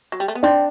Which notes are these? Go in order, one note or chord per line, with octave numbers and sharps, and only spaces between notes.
F#3
G3
A3
B3
C4 D4